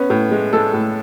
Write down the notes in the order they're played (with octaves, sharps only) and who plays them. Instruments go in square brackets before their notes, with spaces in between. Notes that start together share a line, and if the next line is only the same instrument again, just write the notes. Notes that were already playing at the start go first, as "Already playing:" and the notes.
Already playing: [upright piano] B3 [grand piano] C#4
[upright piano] A2
G#3
[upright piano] G#3 [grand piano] A4
[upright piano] A2